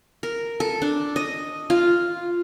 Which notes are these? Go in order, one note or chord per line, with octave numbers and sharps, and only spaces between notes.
A#4
A4
D4
D#5
F4